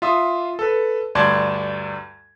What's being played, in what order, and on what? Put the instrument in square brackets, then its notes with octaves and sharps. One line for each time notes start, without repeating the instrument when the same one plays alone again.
[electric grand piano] F4 E5 C6 D#6
A4 B4
D2 G2 D5 A5 C6 G#6